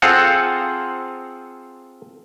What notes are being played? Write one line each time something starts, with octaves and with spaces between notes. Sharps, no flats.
C4 F4 G#4 A4 F5 F#5